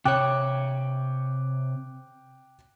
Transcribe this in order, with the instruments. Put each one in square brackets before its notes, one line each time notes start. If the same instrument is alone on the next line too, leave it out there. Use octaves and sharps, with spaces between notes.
[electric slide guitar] C3 C#5 [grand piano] G5 D6 F#6